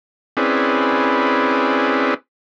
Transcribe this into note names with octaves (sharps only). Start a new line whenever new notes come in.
C4 C#4 E4 G#4 B4 D5